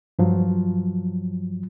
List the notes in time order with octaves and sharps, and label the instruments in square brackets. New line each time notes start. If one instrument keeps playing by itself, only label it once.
[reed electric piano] G2 F3 F#3